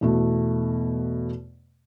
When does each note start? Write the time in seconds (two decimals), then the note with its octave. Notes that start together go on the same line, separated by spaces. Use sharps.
0.01 E2 B2 A3